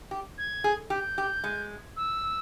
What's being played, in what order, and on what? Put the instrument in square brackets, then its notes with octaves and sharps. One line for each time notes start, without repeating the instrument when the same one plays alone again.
[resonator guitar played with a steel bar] G4
[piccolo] G#6
[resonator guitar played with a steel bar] G#4
[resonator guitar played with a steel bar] G4 [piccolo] G6
[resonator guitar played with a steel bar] G4
G#3
[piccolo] E6